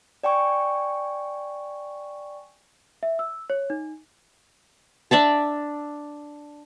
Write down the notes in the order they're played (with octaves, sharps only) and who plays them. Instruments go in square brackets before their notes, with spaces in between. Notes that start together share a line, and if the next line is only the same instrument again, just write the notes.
[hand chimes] D5 G5 G#5 C#6
[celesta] E5
E6
C#5
D#4
[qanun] D4 D5 E5 A5